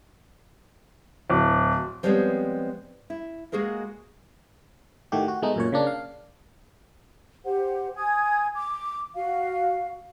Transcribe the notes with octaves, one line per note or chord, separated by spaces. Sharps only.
D1
F3 G3 G#3 B3 C4 C#5
E4
G#3 A#3 F#4 G#4 A#4
A2 D#3 A3 F#4 G4
F#4
B2 G#3 A3 D#4
F#2 A#2 C#5
C#3 A#3 D4
F5
G4 C5 F#5
G#5 D#6 G#6
D6
F#4 F5